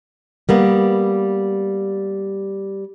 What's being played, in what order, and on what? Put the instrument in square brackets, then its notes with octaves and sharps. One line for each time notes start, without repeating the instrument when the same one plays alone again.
[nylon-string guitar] G3 A#3 B3